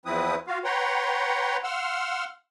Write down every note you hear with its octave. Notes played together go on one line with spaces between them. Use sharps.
E2 F3 C4 E4 B4 D#6
F4 F#4 F5
B4 C#5 F#5 G5 A#5 C6
F5 F#5 C6 E6 F6